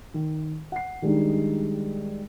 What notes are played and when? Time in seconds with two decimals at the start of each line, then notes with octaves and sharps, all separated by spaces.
0.14 D#3
0.72 F#5 C7
1.02 D#3 G3 G#3 D4 D#4